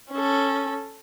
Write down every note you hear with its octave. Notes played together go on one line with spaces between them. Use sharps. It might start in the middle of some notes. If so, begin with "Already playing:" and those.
C#4 A4